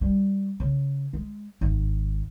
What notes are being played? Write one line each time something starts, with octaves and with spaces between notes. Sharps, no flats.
G3
C#3
G#3
G#1